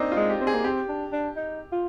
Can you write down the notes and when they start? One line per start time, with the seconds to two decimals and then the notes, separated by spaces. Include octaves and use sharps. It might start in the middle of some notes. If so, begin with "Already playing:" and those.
Already playing: A#3 C4 D4 D#4
0.12 F4
0.17 G#3
0.30 G4
0.41 C4
0.47 G#4
0.54 A#3
0.64 C4 G4
0.89 D4
1.12 D4
1.36 D#4
1.72 F4